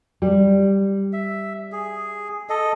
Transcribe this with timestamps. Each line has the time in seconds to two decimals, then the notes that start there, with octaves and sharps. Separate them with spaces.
0.22 G3
1.13 E5
1.72 G#4
2.49 A4 D#5